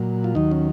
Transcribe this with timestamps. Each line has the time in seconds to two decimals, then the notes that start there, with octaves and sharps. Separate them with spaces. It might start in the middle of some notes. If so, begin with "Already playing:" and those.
Already playing: A#2 F#3
0.24 F4
0.35 D#2 D#3 F#3 D#4
0.51 C#4